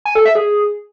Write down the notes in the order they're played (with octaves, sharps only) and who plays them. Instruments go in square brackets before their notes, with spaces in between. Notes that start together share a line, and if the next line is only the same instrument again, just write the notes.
[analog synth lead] G#5
A4
E5
G#4